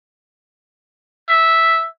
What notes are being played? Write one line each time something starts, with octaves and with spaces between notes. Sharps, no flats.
E5